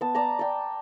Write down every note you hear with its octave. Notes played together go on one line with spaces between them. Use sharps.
B3 A5
D5 A5 A#5
D5 G5